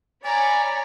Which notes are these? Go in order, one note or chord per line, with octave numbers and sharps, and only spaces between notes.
C#5 D5 G#5 A#5 B5